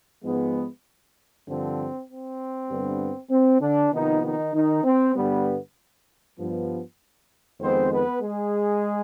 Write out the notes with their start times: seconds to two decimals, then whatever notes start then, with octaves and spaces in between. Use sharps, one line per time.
0.23 G#2 F3 G#3 B3
1.47 G2 D3 F3 C4
2.08 C4
2.69 G2 D3 G3 B3
3.30 C4
3.61 D3 D4
3.92 C3 D#3 F3 B3 D#4
4.22 D#3 D#4
4.54 D#3 D#4
4.84 C4
5.14 G2 D3 G3 B3
6.38 G2 F3 B3
7.60 F2 D#3 G#3 B3 C4 C5
7.90 B3 B4
8.21 G#3 G#4